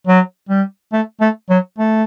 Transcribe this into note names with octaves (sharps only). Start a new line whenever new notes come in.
F#3
G3
A3
A3
F#3
A3